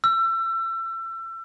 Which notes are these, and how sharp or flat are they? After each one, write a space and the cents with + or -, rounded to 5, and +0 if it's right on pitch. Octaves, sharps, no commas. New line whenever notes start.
E6 +30